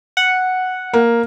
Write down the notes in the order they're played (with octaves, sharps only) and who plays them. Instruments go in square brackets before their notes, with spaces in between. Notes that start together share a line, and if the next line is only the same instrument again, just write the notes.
[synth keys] F#5
[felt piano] A#3